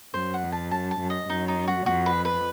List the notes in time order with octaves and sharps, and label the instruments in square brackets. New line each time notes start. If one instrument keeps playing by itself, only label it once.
[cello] F#2 [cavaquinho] C5
[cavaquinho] F#5
[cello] F2
[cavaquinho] A5
[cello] F#2 [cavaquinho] A5
[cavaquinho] A5
[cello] F#2
[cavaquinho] D#5
[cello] F#2 [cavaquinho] D#4
[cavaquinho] D#4
F#4
[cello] F2 [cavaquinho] F#4
[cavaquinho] B4
B4